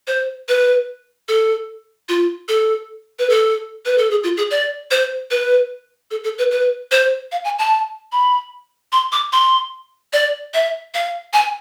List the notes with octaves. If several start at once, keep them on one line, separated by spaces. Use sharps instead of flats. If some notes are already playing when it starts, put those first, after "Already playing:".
C5
B4
A4
F4
A4
B4
A4
B4
A4
G#4
F4
G#4
D5
C5
B4
A4
A4
B4
B4
C5
F5
G#5
A5
B5
C6
D6
C6
D5
E5
F5
G#5